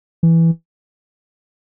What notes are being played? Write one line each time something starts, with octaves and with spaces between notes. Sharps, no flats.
E3